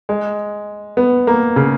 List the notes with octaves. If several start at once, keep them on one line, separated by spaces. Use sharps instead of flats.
G#3
B3
A#3
C#3